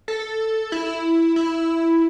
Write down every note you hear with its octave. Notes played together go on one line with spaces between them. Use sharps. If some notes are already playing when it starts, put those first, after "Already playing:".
A4
E4
E4